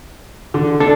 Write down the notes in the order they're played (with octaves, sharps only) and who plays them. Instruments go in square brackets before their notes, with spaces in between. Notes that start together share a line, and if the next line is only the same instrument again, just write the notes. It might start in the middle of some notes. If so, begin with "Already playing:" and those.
[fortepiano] D3
[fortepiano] D4 [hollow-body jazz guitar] A4